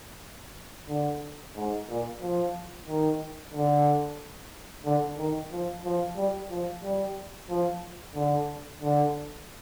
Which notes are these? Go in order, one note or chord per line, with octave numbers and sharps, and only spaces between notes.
D3
G#2
A#2
F3
D#3
D3
D3
D#3
F3
F3
G3
F3
G3
F3
D3
D3